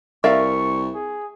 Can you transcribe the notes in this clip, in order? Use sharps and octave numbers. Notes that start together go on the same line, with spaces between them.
C2 A#4 D5 E5 F5 C#6
G#4